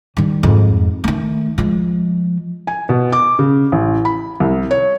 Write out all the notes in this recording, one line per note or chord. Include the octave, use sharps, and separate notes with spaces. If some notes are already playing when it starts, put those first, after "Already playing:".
D#3 G3
F2 G#2
D#3 A3
F3 G#3
G#5
B2
D6
C#3
A1
B5
C2
C#5